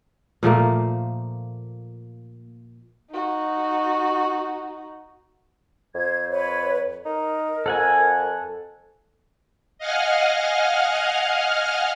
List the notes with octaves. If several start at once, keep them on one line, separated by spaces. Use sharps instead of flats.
A#2 F3 A3 A#3
D#4 F#4
F2 C5 G#6
B4 C#5
D#4 A#4
F2 A4 F#5 G#5
D#5 F5 F#5 G#5 F6